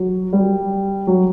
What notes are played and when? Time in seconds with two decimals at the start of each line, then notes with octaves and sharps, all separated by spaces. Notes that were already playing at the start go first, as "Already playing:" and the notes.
Already playing: F#3
0.33 G3
1.07 F#3